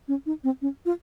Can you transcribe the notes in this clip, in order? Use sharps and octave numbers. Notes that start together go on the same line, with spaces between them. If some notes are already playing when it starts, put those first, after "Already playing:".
C#4
D#4
C4
C#4
F4